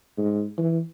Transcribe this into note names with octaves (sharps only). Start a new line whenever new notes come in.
G#2
E3